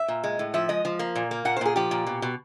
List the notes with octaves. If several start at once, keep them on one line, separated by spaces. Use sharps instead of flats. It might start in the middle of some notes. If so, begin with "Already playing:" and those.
Already playing: E5
A#2
G#3
A2
F3 E5
G#3 D#5
F3
A#3
A#2
A#3
A#2 F#5
C5
A#2 G#4
F3 G4
A#2
B2
B2